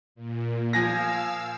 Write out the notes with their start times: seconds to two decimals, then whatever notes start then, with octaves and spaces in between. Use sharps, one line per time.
0.15 A#2
0.73 F3 F5 G#5 E6 A#6